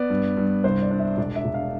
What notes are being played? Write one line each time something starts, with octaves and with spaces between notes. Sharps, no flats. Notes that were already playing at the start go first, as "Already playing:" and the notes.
Already playing: B3 D5
G2
G2
C2 C5
D5
D4
E5
E1 D5
E5
E1
F5